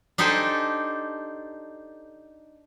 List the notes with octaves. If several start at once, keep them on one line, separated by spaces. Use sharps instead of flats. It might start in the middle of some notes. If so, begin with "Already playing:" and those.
D4 D#4 G4 A4 C5 G#5